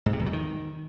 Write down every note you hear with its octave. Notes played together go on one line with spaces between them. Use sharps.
G#2
C3
E2
F#3
D#3